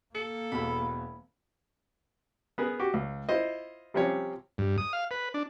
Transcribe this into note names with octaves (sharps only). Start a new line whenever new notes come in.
A#3 A4 C#7
E1 B2 E4 B5
B3 G#4 A#4 B4
F#4 G4
C#2
E4 F4 C5 D#5
C3 F3 G3 C4 C#4 C#5
G2
D#6
F5
B4
D4